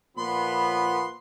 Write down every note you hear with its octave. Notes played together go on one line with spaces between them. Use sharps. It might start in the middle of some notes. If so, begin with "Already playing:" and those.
A#2 F3 B3 B5 C6